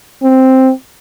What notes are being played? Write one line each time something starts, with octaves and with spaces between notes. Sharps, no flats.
C4